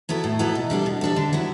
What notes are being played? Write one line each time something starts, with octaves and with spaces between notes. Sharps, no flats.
F#3 B3 E4 A4
A2
F#3 B3 E4 A4
B2
G3 D4 A4
B2
G3 D4 A4
D3
F#3 B3 E4